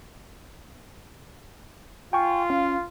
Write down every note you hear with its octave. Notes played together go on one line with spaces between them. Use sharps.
F4 G5 G#5 C#6
C#4 F5